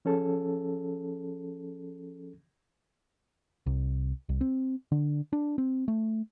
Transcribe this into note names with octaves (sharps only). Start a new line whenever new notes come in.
F3 C#4 G#4 A4
C2
C2
C4
D3
D4
C4
A3